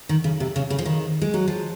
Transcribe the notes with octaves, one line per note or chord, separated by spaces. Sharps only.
D#3
C#3
C3
C#3
C#3
F3
D#3
G#3
F#3
F3